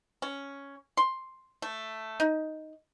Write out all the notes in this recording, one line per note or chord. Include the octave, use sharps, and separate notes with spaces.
C#4
C6
A3
D#4